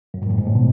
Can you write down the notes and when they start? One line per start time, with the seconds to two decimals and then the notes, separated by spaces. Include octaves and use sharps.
0.14 F#2
0.22 G#2
0.30 A2
0.38 G#2
0.47 A2
0.55 B2